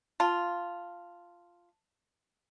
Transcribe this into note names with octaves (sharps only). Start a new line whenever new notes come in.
F4 A5